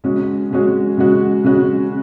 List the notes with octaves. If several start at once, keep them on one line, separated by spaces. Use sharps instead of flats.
C#3 G#3 C#4 F#4
C#3 G#3 C#4 F#4
C#3 G#3 C#4 F#4
C#3 G#3 C#4 F#4